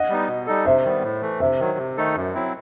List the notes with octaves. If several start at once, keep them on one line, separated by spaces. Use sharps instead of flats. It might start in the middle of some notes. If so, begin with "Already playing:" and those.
Already playing: D#5 F#5
G3 B3 D#4
B2
G3 D#4 A4
C3 C5 E5
D#3 G3 B3
A2
E3 A3
C3 C5 E5
D#3 F#3
C3
D#3 A3 D#4 A4
F#2
F#3 C4 E4